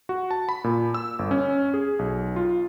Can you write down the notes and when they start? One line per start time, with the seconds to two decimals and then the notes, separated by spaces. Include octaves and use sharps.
0.09 F#4
0.31 A5
0.49 B5
0.64 A#2
0.94 E6
1.19 G1
1.31 C#4
1.74 G#4
1.99 B1
2.36 F4